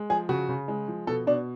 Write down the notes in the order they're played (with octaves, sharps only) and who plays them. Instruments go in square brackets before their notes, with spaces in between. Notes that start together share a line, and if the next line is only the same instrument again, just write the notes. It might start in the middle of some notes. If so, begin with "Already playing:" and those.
Already playing: [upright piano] G#3
F3 G#4
C#3 F#4
C#3
G#3
F3
B2 A4
B2 D4